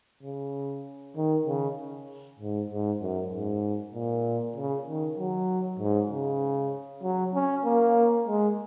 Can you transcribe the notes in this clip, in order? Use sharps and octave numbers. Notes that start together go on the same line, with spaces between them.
C#3
D#3
C#3
G#2
G#2
F#2
G#2
A#2
C#3
D#3
F#3
G#2
C#3
F#3
C#4
A#3
G#3